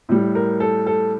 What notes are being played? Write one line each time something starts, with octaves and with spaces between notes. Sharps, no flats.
A2 G3
A#4
A4
A4